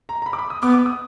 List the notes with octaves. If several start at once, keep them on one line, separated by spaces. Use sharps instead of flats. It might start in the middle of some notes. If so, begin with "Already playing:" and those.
A#5
A#5
B5
D6
B5
D#6
B3 D6
D6
D#6